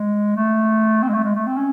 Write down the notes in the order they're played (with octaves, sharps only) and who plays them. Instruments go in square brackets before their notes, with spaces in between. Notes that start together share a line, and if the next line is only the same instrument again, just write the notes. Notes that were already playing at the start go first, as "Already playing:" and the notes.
Already playing: [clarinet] G#3
A3
C4
G#3
A3
G#3
A3
C4
C#4